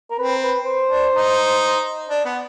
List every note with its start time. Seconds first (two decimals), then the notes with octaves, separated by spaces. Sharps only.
0.11 A#4
0.18 C4 B4
0.42 B4
0.65 C5
0.90 D4
1.14 D#4
2.10 D4
2.25 B3